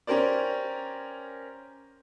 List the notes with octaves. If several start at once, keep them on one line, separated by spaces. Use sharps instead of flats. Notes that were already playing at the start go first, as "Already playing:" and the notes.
C#4 G4 A#4 C5 D5